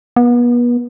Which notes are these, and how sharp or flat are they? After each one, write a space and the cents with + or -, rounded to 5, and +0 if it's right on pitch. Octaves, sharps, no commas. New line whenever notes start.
B3 -35